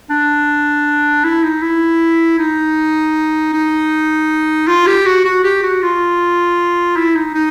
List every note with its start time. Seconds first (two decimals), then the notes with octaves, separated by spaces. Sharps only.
0.10 D4
1.24 E4
1.43 D#4
1.62 E4
2.39 D#4
3.53 D#4
4.67 F4
4.87 G4
5.06 F#4
5.25 F#4
5.44 G4
5.63 F#4
5.82 F4
6.96 E4
7.15 D#4
7.34 D#4